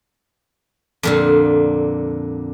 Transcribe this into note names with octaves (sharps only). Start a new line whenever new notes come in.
F2 A#2 D3